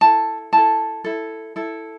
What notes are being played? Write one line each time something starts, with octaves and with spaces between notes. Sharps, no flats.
E4 A4 A5
E4 A4 A5
E4 A4
E4 A4